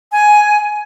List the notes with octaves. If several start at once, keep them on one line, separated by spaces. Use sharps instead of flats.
G#5